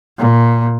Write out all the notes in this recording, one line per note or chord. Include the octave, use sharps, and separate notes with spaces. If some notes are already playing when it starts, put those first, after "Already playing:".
A#2